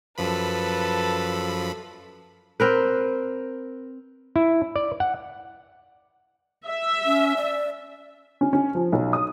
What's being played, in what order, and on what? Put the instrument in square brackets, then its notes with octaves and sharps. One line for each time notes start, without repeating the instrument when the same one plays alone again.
[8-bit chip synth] F#2 F3 B5 [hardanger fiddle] A4 B4
[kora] C4 A#4 B4
[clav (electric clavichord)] E4
D5
F#5
[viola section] E5
[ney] C#4
D5
[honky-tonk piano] C#4
C#4
F3
B1
D#6